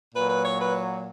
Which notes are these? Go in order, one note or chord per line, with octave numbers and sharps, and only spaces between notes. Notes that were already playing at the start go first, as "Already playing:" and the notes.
A#2 F#3 B4
B4
C#5
B4